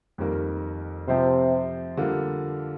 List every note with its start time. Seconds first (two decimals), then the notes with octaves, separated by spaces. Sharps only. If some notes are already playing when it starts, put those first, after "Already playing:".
0.18 F2 D#3 G3 A#3
1.08 C3 F3 C4 G4 C5
1.97 D3 G3 A#3 F4